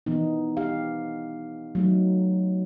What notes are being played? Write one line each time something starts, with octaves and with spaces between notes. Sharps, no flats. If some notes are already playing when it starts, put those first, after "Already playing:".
E3 B3 D#4
G4 F5
F#3 A3 D#4